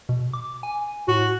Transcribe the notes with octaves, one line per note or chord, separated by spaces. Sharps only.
B2
D6
G#5
A2 F#4